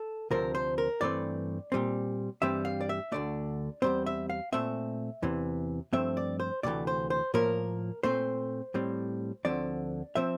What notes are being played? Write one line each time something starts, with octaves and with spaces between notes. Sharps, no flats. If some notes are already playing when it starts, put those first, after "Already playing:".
Already playing: A4
D2 C3 F3 C4 A#4
C5
A#4
G2 E3 A3 C4 D5
A#2 G3 C4
G2 E3 G3 C4 E5
F5
D5
E5
D2 D3 A3 D5
E2 C3 G3 C4 C5
E5
F5
A#2 A3 C4 E5
E2 C3 E3
G2 F3 A3 C4 E5
D5
C5
D2 C3 E3 A3 D5
C5
C5
A2 F3 A#3 A#4
A#2 A3 C4 C5
A2 G3 C4
D2 D3 F3 C4 D5
F3 C4 E5